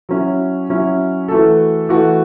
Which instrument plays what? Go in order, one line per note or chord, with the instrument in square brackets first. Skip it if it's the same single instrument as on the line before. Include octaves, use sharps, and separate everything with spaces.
[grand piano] F#3 C#4 E4
F#3 C#4 E4
E3 A3 F#4 A4
E3 A3 F#4 A4